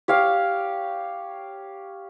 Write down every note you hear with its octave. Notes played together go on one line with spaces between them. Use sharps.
G4 C#5 F5